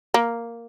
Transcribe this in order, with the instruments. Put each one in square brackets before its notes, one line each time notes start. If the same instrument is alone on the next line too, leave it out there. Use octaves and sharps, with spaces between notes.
[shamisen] A#3